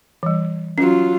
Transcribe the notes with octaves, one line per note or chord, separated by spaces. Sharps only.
E3 G3
F#3 C#4 F4